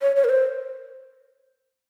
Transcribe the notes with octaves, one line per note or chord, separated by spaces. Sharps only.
C#5
C#5
A#4
C5